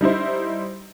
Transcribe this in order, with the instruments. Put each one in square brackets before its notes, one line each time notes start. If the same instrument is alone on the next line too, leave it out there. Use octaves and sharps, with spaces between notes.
[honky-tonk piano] G3 D#4 E4 C5